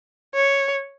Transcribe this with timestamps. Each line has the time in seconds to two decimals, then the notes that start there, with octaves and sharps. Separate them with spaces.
0.34 C#5